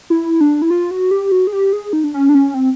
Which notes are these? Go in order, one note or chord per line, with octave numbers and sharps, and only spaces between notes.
E4
D4
E4
F4
F#4
G4
F#4
G#4
G4
G#4
D#4
D4
C#4
D4
C#4
C4